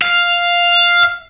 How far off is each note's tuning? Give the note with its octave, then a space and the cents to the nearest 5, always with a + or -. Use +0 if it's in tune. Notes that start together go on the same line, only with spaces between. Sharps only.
F5 +0